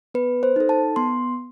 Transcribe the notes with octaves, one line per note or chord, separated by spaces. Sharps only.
B3 B4
C5
D#4 A4
A5
B3 C6